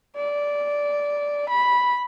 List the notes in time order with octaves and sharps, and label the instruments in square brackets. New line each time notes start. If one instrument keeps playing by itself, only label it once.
[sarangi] D5
B5